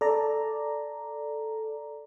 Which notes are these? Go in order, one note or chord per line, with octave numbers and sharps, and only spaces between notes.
A4 D5 A#5